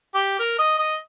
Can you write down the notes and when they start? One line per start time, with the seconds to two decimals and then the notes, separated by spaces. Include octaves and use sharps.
0.15 G4
0.40 A#4
0.59 D#5
0.78 D#5